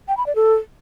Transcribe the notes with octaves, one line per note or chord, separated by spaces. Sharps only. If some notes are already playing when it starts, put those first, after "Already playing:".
G5
B5
D5
A4